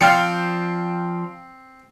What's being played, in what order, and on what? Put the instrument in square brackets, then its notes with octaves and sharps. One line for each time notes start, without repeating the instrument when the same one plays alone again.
[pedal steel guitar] F3 D5 F6 [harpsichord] C4 [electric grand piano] F5 G5 C#7